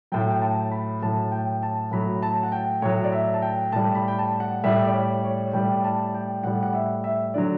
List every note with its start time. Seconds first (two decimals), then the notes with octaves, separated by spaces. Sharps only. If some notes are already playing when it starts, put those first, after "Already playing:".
0.12 A2 F#3 G5
0.30 G5
0.41 A5
0.71 B5
1.02 A2 F#3 A5
1.32 G5
1.63 A5
1.92 A2 F#3 B5
2.22 A5
2.43 F#5
2.52 G5
2.82 A2 F#3 C#5
3.04 D5
3.12 E5
3.34 A5
3.42 G5
3.72 A2 G3 A5
3.95 B5
4.08 G5
4.19 A5
4.40 F#5
4.64 A2 G3 E5
4.86 D5
4.93 C#5
5.23 C#5
5.53 A2 G3 G5
5.84 A5
6.14 G5
6.44 A2 G3 F#5
6.63 F#5
6.73 E5
7.04 E5
7.34 D3 F#3 D5